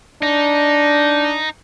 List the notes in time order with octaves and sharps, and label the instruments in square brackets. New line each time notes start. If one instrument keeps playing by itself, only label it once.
[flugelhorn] D4 [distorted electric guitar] D#4